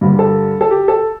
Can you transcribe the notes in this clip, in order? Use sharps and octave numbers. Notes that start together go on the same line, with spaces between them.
G2 D3 G3 A#3
A4
A4
G4
A4